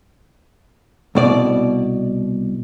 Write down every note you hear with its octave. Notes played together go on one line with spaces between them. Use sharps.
C2 B2 D5